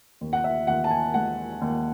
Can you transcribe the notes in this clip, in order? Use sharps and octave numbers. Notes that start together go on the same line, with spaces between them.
D#2
F#5
E5
D#2 F#5
A5
G#5
G#3 F#5
D#2